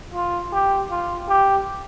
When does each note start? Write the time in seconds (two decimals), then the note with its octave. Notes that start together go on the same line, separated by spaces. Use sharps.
0.14 F4
0.53 G4
0.91 F4
1.29 G4